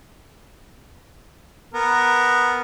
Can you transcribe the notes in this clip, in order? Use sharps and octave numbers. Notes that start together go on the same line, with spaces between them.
B3 A#4